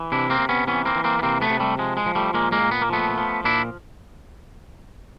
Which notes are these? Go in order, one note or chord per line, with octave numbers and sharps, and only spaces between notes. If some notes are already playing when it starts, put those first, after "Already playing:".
Already playing: E3
C3 D4 E4
A#3 C4
C3
B3 C#4
E3 B3 C#4
A#3 C4
E3
A#3 C4
B3
C3 A#3 C4
A3 B3
C3
G3 A3
F3 G#3
G#3
F3
G3 A3
A#2 G#3 A#3
G#3 A#3
A#2
B3
A#3
F3 A3 B3
F3
A#2 D4 E4